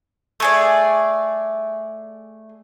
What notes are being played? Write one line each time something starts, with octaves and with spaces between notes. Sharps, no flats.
A3 G#4 D5